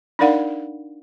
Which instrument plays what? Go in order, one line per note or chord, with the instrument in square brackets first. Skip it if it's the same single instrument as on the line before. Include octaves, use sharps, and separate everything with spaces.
[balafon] D4 D#4 A#4 D5 F5 F#5